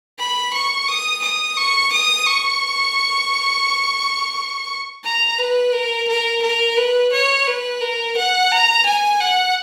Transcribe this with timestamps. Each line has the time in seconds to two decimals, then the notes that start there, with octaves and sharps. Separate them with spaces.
0.18 B5
0.54 C#6
0.88 D#6
1.23 D#6
1.57 C#6
1.93 D#6
2.26 C#6
5.04 A#5
5.38 B4
5.73 A#4
6.08 A#4
6.42 A#4
6.77 B4
7.13 C#5
7.47 B4
7.81 A#4
8.17 F#5
8.52 A#5
8.86 G#5
9.20 F#5